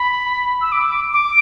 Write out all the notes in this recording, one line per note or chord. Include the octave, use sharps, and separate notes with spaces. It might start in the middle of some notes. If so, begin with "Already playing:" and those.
Already playing: B5
E6
D6
D6